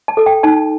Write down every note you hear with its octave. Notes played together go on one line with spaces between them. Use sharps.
A5
A4
G5
D#4 A5